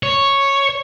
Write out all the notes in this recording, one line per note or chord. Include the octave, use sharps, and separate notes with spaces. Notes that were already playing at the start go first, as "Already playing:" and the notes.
C#5